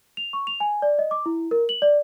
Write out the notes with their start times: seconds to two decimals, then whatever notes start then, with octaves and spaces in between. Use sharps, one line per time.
0.17 F7
0.33 C#6
0.47 F7
0.60 G#5
0.82 D5
0.99 D#5
1.11 D6
1.26 E4
1.51 A#4
1.69 F#7
1.82 D5